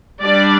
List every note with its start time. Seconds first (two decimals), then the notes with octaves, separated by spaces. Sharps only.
0.21 G3 D4 D5